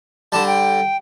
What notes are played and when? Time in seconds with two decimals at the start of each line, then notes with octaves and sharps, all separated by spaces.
0.32 D3 G3 A5
0.47 G5